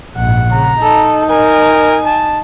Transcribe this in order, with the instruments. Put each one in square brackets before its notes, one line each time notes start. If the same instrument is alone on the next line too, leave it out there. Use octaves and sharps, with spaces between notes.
[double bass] A#1 G#2 [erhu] F#5
[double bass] C#3 [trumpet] A#5
[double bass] D#4 [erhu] A4
[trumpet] A#4 [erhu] G#5
[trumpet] A5